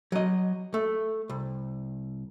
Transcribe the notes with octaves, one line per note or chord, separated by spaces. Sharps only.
F#3 D#5
A3
C2